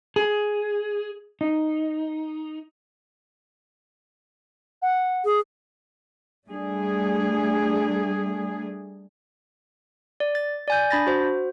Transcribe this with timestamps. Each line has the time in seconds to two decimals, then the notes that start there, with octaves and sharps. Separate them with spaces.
0.16 G#4
1.41 D#4
4.82 F#5
5.25 G#4
6.48 G3 A3 D4 G#4
10.20 D5
10.35 A6
10.68 D5 G#5 G6
10.91 D4 B5 A6 A#6
11.07 F#4 C5